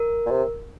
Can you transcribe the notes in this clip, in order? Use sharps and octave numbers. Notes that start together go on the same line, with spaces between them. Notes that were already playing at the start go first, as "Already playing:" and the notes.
Already playing: A#4
A#2
C3